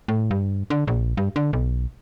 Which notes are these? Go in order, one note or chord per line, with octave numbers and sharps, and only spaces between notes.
A2
G2
D3
A#1
G2
D3
B1